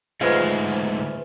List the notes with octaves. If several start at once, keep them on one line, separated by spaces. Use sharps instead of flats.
D2 G#2 G#3 F4 B4 C5 E5